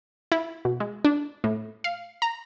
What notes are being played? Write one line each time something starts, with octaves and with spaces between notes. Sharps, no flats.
E4
B2
G#3
D4
A2
F5
A#5